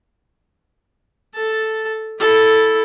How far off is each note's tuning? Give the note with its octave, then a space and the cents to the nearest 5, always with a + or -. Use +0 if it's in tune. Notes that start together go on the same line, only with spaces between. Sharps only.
A4 +0 A5 +0
E4 -10 A4 +0